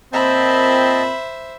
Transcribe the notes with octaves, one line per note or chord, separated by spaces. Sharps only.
A#2 C4 C5 D#5 E5 A5 B5